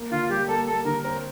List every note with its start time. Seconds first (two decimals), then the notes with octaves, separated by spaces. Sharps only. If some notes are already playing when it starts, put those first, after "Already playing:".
Already playing: A#3
0.11 D3 F4
0.30 G3 G4
0.48 A#3 A4
0.67 A#3 A4
0.85 D3 A#4
1.04 C4 A#4